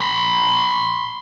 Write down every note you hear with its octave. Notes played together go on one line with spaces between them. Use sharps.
B5 C6